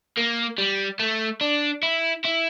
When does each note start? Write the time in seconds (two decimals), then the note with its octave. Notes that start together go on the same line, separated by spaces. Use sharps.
0.17 A#3
0.58 G3
0.99 A3
1.41 D4
1.83 E4
2.24 E4